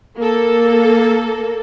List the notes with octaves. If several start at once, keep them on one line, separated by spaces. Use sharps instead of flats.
A#3 A4